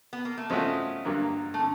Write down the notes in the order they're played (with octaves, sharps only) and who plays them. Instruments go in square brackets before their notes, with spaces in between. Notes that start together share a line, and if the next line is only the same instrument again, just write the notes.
[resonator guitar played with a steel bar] B3
A#3
A3
[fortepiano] C#3 F3 A3 C#4 F#4 [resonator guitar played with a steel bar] G#3
[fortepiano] G2 D3 F#3 A#3
[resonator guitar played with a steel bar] A3
[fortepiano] D3